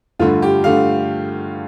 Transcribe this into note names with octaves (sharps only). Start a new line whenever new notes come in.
G2 D3 A3 F4
G4
D3 A3 F5